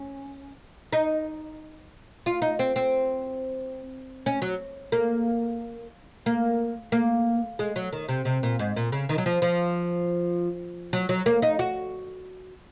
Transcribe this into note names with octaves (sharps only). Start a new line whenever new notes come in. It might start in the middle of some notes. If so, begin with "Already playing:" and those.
Already playing: C#4
D#4
F4
D#4
C4
C4
C#4
F#3
A#3
A#3
A#3
G#3
F#3
D#3
C3
C3
A#2
G#2
A#2
C#3
D#3
F#3
F3
F3
F#3
F#3
A#3
D#4
F#4